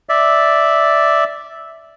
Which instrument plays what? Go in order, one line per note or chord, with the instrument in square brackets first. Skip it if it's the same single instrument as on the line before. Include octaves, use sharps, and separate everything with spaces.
[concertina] D5 E5